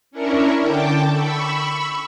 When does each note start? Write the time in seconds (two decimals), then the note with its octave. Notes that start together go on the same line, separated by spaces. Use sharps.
0.11 C#4 D4 E4 A#4 C#5
0.60 D3 G5 A5 D6
1.11 B5 C#6 E6